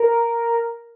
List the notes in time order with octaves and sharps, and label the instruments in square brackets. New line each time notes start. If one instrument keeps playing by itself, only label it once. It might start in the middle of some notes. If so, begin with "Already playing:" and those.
Already playing: [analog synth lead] A#4